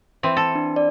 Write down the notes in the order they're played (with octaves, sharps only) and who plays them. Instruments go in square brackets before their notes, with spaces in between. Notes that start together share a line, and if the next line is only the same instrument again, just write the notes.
[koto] E3 C4
A4
[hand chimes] D4
D5